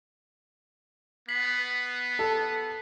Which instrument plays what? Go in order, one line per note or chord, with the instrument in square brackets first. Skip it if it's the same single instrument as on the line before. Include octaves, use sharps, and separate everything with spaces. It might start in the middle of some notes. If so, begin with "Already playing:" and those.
[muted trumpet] B3 [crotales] B6 C7 F#7
[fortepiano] A4